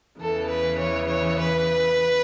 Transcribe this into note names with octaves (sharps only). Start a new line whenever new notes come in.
E2 C#3 E3 A4
B4
C#5
C#5
B4